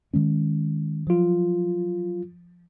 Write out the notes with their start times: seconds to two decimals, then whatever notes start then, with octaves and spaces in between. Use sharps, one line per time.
0.14 D#3 G#3 C#4
1.07 F3 F#3 F4